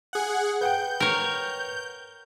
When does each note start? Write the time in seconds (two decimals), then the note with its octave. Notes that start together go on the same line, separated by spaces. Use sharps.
0.13 G#4 F#5
0.61 B4 F#5 G5 G6
1.00 A#4 C#5